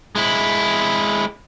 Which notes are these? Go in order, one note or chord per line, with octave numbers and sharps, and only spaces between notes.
G#3 E4